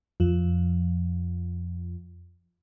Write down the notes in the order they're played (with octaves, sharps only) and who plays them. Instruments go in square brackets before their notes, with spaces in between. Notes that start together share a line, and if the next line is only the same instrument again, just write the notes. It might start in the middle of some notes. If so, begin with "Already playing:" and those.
[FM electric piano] F2 F3